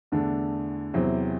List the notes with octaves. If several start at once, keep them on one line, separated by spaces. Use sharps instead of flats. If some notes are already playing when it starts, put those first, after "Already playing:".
E2 D3 A3 D4
E2 C3 F#3 C4 E4